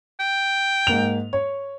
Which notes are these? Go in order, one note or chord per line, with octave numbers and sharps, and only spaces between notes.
G5
G#2 A#3 F7
C#5